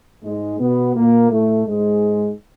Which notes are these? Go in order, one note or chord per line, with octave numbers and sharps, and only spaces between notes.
G#2 G#3
B2 B3
A#2 A#3
A2 A3
G#2 G#3